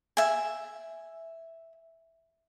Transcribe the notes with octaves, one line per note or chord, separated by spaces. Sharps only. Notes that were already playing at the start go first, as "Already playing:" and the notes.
E5 G#5